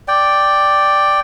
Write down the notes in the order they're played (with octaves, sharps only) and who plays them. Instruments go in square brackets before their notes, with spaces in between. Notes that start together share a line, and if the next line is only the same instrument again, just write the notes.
[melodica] D5 G5